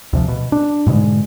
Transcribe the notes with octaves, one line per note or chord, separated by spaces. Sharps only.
D2 C3 F3
B2
D4
G#2 B2 D3 G#3